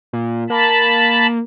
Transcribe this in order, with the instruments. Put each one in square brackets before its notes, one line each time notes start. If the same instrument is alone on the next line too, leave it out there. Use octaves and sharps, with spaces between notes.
[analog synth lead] A#2
[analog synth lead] A#3 [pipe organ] A5 B5